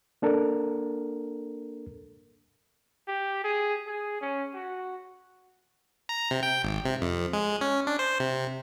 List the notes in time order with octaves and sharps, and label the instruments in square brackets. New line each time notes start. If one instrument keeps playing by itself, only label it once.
[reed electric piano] A#3 D4 A4 A#4
[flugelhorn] G4
G#4
G#4
C#4
F#4
[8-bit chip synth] A#5
C3
G5
G#1
C3
F2
G#3
C#4
D4
C5
C3